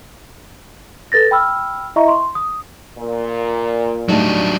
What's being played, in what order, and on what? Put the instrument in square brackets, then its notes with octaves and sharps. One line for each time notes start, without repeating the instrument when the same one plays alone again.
[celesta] A4 B4 A6 A#6
G5 B5 E6 F6
E4 D#5 E5 A#5 C#6
C6
D#6
[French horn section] A#2
[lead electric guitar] F#3 D4 [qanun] G3 A3 D#4